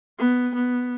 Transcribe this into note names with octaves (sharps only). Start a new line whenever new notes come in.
B3
B3